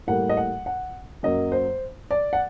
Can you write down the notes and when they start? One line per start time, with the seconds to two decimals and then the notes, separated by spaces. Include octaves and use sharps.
0.07 A2 G3 A#3 F#5
0.29 D#5
0.37 F#5
0.66 F#5
1.23 F#2 F#3 A#3 D#5
1.52 C5
2.11 D5
2.33 F#5